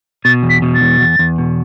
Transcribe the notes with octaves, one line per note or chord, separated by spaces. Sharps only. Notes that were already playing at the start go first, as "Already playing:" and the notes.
B2 A6
E2
B6
B2
A6
E2
E2
E2
B2